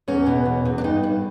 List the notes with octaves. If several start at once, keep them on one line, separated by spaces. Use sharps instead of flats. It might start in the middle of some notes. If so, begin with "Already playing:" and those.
E2 C#4
B2
E2
E2
D4
G2 D#4
G2